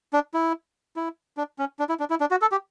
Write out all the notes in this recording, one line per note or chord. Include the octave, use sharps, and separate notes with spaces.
D4
E4
E4
D4
C#4
D4
E4
D4
E4
D4
F#4
A4
G4